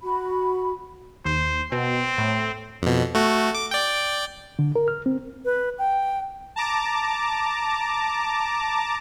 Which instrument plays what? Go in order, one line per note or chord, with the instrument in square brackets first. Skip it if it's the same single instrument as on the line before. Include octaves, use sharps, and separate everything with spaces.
[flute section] F#4 B5
[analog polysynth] D#2 [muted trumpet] C5
[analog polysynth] B2 [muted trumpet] C4
[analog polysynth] A2
[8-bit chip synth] F2 B2
A3 F#4
D6
D5 G5
[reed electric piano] D3
A#4
F6
C4
[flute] B4
G5
[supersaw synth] A5 A#5 D6